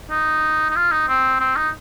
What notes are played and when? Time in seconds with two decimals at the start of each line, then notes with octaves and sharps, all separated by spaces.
0.11 D#4
0.70 D#4
0.76 F4
0.91 D#4
1.08 C4
1.40 C4
1.56 D#4